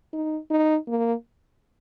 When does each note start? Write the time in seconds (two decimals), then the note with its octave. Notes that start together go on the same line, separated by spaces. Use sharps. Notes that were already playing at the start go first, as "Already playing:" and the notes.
0.13 D#4
0.51 D#4
0.88 A#3